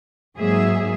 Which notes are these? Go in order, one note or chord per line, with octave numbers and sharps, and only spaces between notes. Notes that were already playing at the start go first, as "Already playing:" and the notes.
G#2 F#3 A#3 G#4 E5